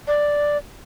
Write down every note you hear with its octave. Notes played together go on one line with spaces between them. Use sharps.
D5